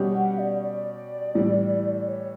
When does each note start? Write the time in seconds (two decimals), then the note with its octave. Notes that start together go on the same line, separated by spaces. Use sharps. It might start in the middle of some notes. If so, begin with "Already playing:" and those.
Already playing: B2 G3 C#4 G4
0.15 F#5
0.39 D5
0.62 D5
1.35 A2 E3 G3
1.96 D5
2.07 C#5